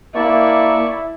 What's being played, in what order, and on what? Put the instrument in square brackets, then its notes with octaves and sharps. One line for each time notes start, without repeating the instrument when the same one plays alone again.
[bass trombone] A#3 [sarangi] E4 [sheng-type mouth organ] D5 A5 C#6